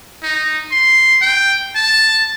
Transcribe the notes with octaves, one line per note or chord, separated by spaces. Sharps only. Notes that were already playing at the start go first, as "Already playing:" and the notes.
D#4
C6
G5
A5